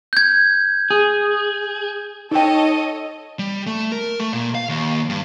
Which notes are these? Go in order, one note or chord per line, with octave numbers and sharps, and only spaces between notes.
G6 G#6
G#4
D#4 A4 C#5 D#5 G5
G3
A3
A#4
A3
A#2
F5
D#2
G2